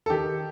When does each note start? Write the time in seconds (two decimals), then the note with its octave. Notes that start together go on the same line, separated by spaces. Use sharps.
0.06 A4
0.10 D#3 G4